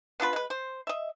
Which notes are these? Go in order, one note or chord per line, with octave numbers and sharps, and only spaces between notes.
B3 D4 F4 B4
G#3 B4
C5
D#5 E5